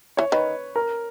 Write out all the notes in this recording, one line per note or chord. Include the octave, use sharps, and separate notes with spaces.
E3 C#5
D#3 B4
A#4